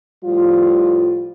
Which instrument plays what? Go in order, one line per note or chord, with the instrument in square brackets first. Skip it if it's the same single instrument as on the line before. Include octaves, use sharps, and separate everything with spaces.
[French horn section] A2 F3 G3 F4